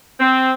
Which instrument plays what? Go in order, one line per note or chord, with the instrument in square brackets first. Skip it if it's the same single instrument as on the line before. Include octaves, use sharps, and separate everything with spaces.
[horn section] C4